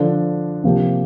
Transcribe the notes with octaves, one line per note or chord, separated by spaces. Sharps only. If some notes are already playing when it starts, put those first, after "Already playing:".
Already playing: D3 F3 D4
C3 F3 A#3 G4